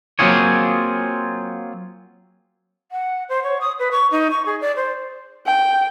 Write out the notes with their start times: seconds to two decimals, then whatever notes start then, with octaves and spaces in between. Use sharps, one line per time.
0.19 F#3 A#3 C4 F4 G#4 C#5
2.92 F#5
3.29 C5
3.43 C#5
3.61 D#6
3.79 B4
3.92 C#6
4.11 D#4
4.31 C#6
4.46 G#4
4.61 D5
4.76 C5
5.47 G5